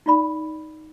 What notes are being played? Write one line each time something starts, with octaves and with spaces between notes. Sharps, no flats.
D#4 F4 D5 B5